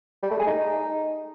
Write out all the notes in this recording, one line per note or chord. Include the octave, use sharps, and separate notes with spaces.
G3
A3
G#4
D#4